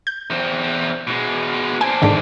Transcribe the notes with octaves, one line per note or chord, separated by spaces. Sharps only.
G6
E2 C4
B2 G#3
C4 D4 G#5
G#2 D3 D#3